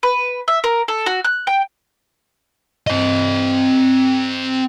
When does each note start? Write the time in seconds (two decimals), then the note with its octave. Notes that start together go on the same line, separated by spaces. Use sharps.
0.03 B4
0.48 E5
0.64 A#4
0.88 A4
1.06 F#4
1.24 F#6
1.47 G5
2.87 C4 D#5